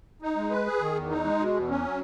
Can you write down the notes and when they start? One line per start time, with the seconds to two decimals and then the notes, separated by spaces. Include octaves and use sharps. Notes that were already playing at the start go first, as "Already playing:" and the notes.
0.22 D#4
0.36 G#3
0.51 B4
0.67 G#4
0.81 D#3
0.95 E2
1.10 D#4
1.24 G#3
1.39 B2
1.54 E2
1.69 C#4
1.83 F#3